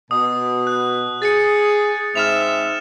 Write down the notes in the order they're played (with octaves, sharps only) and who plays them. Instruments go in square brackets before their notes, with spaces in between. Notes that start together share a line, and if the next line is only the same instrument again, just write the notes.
[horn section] B2 [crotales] D#6
[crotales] F#6
[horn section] G#4 [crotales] A6 C#7
[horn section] G#2 C4 E5 [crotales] F6 E7 F7